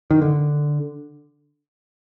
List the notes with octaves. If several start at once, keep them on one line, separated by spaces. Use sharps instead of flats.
D#3
D3